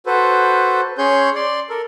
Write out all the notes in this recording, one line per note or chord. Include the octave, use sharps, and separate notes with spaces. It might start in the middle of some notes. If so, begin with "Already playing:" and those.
F#4 A4 B4 C5
C#4 G#4 C#5 C6 G6
D5 C6
A4 A#4